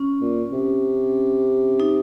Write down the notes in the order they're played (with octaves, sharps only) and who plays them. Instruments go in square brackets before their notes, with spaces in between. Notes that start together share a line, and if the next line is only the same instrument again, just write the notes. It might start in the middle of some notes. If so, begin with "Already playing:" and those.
Already playing: [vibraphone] C#4
[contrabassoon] A#2
C3
[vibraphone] D#4